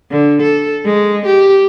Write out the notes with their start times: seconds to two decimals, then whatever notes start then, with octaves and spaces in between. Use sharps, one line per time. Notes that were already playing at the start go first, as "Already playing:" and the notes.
0.11 D3
0.42 A4
0.85 G#3
1.26 G4